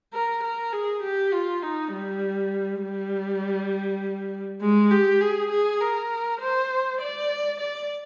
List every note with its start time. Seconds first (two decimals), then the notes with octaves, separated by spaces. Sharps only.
0.13 A#4
0.43 A#4
0.73 G#4
1.02 G4
1.32 F4
1.62 D#4
1.92 G3
2.82 G3
4.61 G#3
4.91 G4
5.21 G#4
5.51 G#4
5.80 A#4
6.40 C5
7.00 D5
7.59 D5